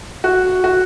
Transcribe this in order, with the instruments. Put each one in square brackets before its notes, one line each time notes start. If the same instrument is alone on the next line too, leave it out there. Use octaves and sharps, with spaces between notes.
[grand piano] F#4
F#4